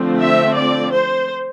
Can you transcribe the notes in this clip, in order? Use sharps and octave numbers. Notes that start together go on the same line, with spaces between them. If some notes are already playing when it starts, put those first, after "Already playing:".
Already playing: D3 F3 A3 C4
E5
D5
C5